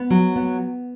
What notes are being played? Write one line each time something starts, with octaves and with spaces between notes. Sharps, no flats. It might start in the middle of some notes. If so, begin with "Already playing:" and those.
Already playing: B3
F#3
B3